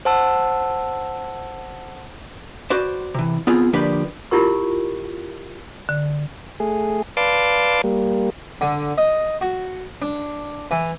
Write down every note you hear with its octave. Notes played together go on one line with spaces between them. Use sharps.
C5 F#5 A5 E6
F#4 B4 C5 D5
C3 E3
B3 C4 F4 G#4
D3 F3 A#3 D4 G4 B4
E4 F4 G4 A#4 C#6
D3
A3 G#4
B4 D5 F5 A5 C6 D6
G3 A#3
D3
D#5
F#4
D4
E3